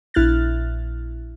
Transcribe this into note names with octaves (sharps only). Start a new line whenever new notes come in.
A#1 E4 F6 F#6 A6